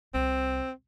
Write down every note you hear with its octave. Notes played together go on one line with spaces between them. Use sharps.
C2 C4